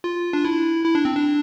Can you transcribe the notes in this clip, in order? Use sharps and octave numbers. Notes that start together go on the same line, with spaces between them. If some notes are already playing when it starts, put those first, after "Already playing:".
F4
D4
E4
E4
D4
C4
D4